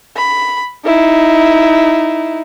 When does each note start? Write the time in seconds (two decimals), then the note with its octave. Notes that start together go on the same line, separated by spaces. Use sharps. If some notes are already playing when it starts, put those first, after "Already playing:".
0.17 B5
0.85 D#4 E4